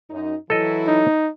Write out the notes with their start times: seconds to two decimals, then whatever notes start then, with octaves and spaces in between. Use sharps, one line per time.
0.10 F#2 D#4
0.50 E3 F#3 E4 A4 D#5
0.87 D#4